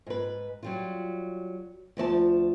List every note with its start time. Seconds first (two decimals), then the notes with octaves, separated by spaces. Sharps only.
0.07 G#2 B4
0.63 F#3 G3 F4
1.97 D2 F3 D5 A5